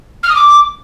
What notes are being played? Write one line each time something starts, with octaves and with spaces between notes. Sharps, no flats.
F6
D#6
D6